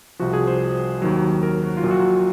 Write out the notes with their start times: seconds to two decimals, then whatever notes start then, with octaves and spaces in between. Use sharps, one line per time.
0.19 C2 C3 F3 F#4
0.33 G#4
0.47 C5
1.02 D#2 D#3 F#3
1.43 A#4
1.63 F#4
1.77 F4
1.83 A#1 A#2 F#3
1.91 F#4